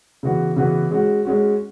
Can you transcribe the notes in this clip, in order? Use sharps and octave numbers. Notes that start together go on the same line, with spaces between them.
C#3 E3 B3 F#4
C#3 E3 B3 F#4
G#3 C#4 F#4
G#3 C#4 F#4